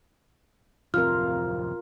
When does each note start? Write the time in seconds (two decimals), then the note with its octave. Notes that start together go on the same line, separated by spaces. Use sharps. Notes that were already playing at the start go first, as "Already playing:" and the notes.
0.94 D1 F2 C3 F4 A#4 F6